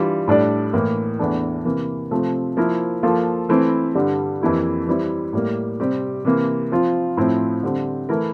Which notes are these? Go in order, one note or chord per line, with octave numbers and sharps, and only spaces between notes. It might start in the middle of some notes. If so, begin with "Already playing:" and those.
Already playing: E3 G3 D4 F4
A2 G3 D4 A4 D5
A2 E3 A#3
E2 E3 A3 D4
C3 E3 A#3
C3 F3 A3 C4
F3 A#3 E4 A#4
F3 A#3 F4 A4
E3 A3 C4 E4
G2 D3 G3
F2 E3 A#3 E4 G4
E3 G3 C4 E4
A2 G3 A#3
C3 G3 C4 G4
C3 E3 A#3
F3 C4 F4
A2 F3 C4 E4
D3 G3 C4
E3 A3 E4 A#4